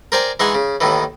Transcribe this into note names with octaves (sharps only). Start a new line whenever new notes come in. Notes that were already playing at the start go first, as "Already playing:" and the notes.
A#4 C5 D5 G5 G#5 A#5
E3 G#3 D#4 F#5 G#5 C#6
C#3
D#2 A2 D#3 E3